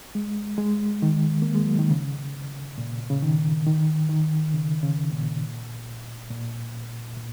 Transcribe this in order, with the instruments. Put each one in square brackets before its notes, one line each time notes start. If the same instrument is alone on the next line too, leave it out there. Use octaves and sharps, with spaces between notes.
[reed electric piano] G#3
G#3
D#3
A#3
G#3
F#3
D#3
C#3
A#2
C#3
D#3
D#3
D#3
C#3
C#3
A#2
A#2
A#2